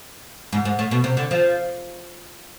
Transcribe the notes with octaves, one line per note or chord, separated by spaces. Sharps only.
G#2
G#2
A2
B2
C3
D3
F3